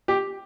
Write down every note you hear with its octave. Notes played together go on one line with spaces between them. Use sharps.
G4